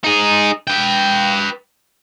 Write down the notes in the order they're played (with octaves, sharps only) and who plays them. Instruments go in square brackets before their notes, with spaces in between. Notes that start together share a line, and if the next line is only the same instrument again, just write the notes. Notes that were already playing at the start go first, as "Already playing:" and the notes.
[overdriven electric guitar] D#4 G#4
B4 G5